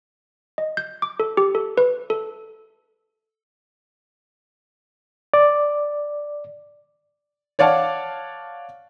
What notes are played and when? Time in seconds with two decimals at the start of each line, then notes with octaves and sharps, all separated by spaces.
0.58 D#5
0.77 G6
1.02 D6
1.20 A4
1.37 G4
1.55 A4
1.78 B4
2.10 A4
5.34 D5
7.59 C#5 D5 F5 F#5 A5